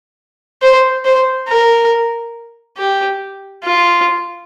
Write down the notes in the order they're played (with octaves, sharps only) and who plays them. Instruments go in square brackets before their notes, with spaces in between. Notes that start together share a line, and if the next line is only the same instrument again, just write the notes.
[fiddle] C5
C5
A#4
G4
F4